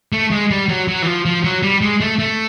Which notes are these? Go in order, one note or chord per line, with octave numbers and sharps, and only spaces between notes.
A3
G#3
G3
F#3
F#3
E3
F3
F3
F#3
G3
G#3
A3
A3